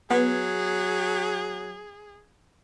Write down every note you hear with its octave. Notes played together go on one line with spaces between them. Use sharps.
F#3 B3 G#4